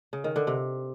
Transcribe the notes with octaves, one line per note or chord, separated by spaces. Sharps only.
C#3
D#3
D3
C3